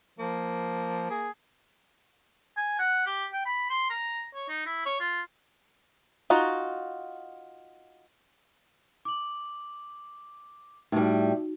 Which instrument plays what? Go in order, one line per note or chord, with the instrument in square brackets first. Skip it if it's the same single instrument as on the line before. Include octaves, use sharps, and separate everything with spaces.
[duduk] F3 [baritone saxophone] A#3
[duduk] G#4
[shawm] G#5
F#5
G4
G5
B5
C6
A#5
C#5
D#4
E4
C#5
F4
[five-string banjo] D#4 F4 F#4
[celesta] D6 F#7
[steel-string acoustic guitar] A2 G3 [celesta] D#4 F#4